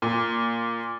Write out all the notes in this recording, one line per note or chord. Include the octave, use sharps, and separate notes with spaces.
A#2